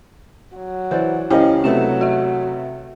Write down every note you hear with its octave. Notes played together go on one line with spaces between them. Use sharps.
F#3
E3 C5 D5
C#2 C#4 E4 G4 A#4 C5 D#5
C3 F#3 A3 B3 E7
F#4 E5